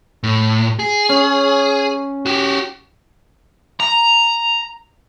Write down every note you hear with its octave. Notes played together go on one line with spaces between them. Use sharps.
A2
G#4
C#4
F#4 G4
A#5